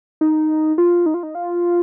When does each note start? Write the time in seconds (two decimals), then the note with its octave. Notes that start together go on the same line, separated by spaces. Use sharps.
0.21 D#4
0.78 F4
1.06 D#4
1.14 F4
1.23 D#4
1.35 F4